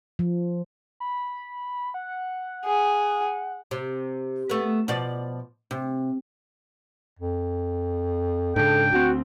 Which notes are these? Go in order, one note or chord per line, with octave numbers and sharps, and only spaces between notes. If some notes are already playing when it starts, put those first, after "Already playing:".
F3
B5
F#5
G#4
C3
A3 B3
B2 F3 D5
C3
F2
G#2 C#3 D4 A4 G5
D2 C4 F#4